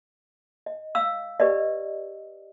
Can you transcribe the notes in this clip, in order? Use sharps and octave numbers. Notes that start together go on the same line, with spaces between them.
D#5
F5 E6
G4 B4 D5 D#5